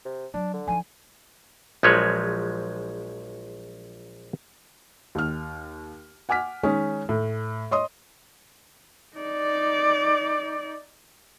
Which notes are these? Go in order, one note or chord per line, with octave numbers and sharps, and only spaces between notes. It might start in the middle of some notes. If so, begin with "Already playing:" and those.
C3
F#3 D4
D3
F3 D#4 G#5
A#1 F3 F#3 G#3 B4 C#5
D#2 F6
F#5 G#5 D6 F6 B6
D#3 G#3 C#4
A2
C#5 D#5 C6 D#6
D#4 D5